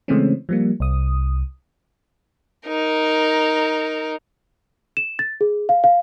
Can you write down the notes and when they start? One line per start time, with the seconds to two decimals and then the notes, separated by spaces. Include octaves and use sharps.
0.08 C#3 E3 G#3 A3 C4 C#4
0.49 F3 G3 A#3
0.80 C2 D#6
2.67 D#4 A#4
4.97 E7
5.19 A6
5.41 G#4
5.69 F5
5.84 F5